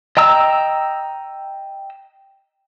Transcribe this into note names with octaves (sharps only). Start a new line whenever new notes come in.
D#5 G5 A#5 E6